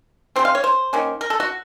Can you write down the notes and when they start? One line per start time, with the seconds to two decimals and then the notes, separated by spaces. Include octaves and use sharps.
0.36 C#3 F#3 C4 C5
0.45 F5
0.55 C#5
0.64 C5
0.93 D#3 A#3 C#4
1.21 A#4
1.30 A4
1.40 F#4